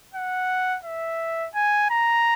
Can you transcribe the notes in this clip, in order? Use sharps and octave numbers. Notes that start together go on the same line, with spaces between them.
F#5
E5
G#5
A#5